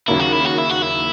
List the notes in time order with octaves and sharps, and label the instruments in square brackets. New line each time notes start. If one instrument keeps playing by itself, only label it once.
[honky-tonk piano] D#2 C#3 F#3 A#3 [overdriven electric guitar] E4
[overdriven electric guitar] F#4
E4
F#4
E4
F#4
E4